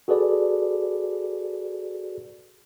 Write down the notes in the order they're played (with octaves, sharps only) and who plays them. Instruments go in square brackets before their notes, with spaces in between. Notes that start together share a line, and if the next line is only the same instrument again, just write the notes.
[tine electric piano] F#4 G#4 A4 B4 D5